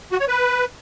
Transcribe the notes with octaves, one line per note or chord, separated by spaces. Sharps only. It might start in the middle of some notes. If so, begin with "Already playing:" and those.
F#4
C#5
B4